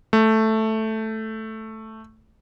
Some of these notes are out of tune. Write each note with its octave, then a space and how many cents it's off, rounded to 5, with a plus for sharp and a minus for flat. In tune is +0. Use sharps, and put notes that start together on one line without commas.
A3 +0